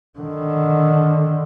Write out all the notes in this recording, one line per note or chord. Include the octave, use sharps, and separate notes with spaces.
D3 D#3